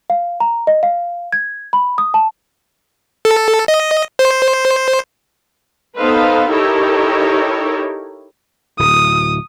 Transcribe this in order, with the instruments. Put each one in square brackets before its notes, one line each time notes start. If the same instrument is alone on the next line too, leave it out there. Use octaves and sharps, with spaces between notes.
[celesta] F5
A#5
D#5
F5
G#6
B5
D#6
A5
[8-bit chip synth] A4
D#5
C5
[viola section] B3 D#4 A4 B4 C5 F5
D#4 E4 G4 A4 A#4 C#5
[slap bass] D1 [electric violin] D#6